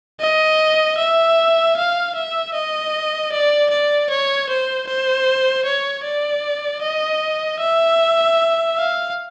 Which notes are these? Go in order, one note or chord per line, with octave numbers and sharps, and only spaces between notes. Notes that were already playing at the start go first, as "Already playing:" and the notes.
D#5
E5
F5
E5
D#5
D5
D5
C#5
C5
C5
C#5
D5
D#5
E5
F5